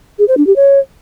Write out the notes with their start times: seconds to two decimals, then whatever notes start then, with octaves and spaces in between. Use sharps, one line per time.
0.19 G#4
0.28 C5
0.37 D4
0.47 G4
0.56 C#5